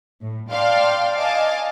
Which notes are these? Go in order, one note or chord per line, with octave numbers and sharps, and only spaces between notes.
A2
D5 F5 G5 A5 C6
D#5 F5 G#5 A5 D6